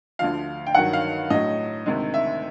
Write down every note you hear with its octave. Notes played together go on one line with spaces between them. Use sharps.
D2 D3 F3 F5
G5
G2 D#3 F#3 F#5
F5
A2 F#3 D#5
D2 C3 D#3 G#3
E5